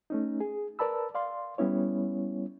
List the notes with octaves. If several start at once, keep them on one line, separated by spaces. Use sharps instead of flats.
A3 C#4 D#4
G#4
A#4 B4 D5 A5 B5 E6
D5 F5 C6
G3 B3 C#4 E4 C#5